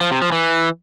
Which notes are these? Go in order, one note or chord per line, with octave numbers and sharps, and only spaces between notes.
F3
C3
F3
E3